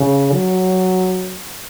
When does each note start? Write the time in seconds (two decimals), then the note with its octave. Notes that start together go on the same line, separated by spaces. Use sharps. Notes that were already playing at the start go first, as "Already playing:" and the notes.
Already playing: C#3
0.32 F#3